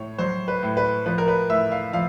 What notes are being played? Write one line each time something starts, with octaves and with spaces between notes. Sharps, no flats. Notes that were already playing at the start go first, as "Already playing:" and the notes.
Already playing: A2 C#5
F#3 C5
B4
A2
B4
F3 B4
A#4
B4
A2 E5
F5
F3 F5